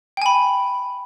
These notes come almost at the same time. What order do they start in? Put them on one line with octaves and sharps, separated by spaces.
G5 G#5 B5